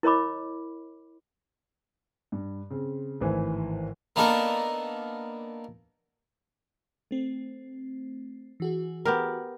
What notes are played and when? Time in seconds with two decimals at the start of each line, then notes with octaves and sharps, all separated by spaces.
0.03 E4 A#4 C#5 D#5 B5 D6
2.32 G2
2.70 C#3 C4
3.21 G#1 A2 E3 C5 G#5
4.16 A#3 B3 D4 D#4 A4 A#4
7.11 A3 C4
8.60 E3 F#4 G#4
9.05 B3 G4 A#4